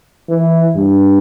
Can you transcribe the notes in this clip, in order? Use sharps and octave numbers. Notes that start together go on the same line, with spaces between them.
E3
G2